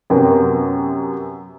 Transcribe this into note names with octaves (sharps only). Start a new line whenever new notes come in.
F#2 C3 B3 A#4 G5